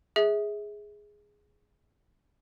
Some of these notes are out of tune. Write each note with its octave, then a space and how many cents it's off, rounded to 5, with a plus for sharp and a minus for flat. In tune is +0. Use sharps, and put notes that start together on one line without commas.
G#4 +0 E5 -25